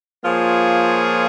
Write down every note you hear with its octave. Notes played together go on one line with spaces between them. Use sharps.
F3 A#3 F4 G#4 C#5